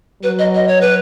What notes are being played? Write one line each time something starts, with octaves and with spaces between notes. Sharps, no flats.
F#3 B4
D#5
D#5
C#5
B4